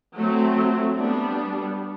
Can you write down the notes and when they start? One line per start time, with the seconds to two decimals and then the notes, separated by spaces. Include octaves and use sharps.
0.15 F#3 A3 C4
0.96 G3 B3 D4